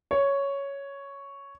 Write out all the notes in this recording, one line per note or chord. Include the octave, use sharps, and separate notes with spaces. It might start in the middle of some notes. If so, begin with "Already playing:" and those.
C#5